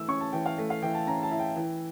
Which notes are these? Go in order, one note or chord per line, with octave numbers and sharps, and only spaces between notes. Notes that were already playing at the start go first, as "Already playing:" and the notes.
Already playing: E3 A3 E6
C#4 C#6
A5
E3 G5
F5
A3
F5
E3 G5
A5
C#4 A#5
A5
E4
G5
E3